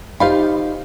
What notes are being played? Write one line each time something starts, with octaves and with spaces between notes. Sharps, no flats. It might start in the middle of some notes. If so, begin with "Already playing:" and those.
D#4 F4 G4 C5 F5 B5